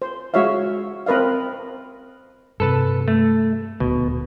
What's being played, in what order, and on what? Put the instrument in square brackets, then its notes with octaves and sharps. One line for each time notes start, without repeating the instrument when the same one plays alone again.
[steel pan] C5
G#3 F#4 C#5 E5 F5
C4 A#4 B4 D#5 F5
[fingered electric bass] G2 C3 [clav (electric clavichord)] A4 B4 A5
[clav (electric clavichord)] A3
[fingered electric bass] D#1 D2 [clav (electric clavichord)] B2